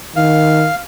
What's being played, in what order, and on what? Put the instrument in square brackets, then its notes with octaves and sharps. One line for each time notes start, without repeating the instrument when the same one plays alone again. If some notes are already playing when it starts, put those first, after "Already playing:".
[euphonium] D#3 [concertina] F5